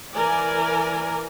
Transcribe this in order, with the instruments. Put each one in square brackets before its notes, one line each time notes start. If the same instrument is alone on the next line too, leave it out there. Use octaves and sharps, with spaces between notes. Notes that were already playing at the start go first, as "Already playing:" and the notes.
[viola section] E3 A#4 D5 G#5